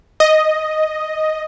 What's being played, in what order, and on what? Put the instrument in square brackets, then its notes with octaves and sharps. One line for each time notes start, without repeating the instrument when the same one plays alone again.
[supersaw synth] D#5